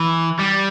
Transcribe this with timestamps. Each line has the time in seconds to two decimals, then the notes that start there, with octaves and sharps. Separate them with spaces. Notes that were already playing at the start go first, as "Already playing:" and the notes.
Already playing: E3
0.40 G3